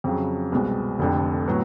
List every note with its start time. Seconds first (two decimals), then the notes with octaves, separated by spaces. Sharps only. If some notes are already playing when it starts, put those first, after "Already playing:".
0.04 F2 C#3 F#3
0.52 C2 B2 G#3 C4
0.99 F1 F2 D3
1.48 A2 F#3 B3